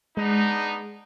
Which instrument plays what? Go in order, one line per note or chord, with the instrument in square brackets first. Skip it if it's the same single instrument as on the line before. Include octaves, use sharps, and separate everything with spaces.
[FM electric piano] G#3 [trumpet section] B3 D4 D#4